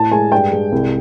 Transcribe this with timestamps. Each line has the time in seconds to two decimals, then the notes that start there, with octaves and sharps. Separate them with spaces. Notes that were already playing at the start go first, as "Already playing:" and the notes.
Already playing: A2 A5
0.12 G#3 G#5
0.32 G2 G5
0.52 G#3
0.72 C2